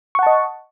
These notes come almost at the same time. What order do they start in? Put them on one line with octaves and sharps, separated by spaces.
C#6 F#5 A5 D#5